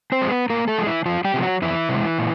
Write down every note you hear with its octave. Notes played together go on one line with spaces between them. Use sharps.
C4 C5
F3 G#3
B3 B4
A2 A#3 A#4
A3 A4
F3 G#3
E3 E4
F2 F3 F4
G3 G4
C3 F3 G#3
F#3 F#4
F2 E3 E4
C3 F3 G#3
A#2